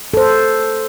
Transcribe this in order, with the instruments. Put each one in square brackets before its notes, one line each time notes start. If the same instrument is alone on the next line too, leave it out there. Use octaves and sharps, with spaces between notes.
[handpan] A4 C5